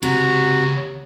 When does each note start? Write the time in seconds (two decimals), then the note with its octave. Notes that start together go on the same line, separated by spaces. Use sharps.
0.03 C#2 C3 F#4 A#5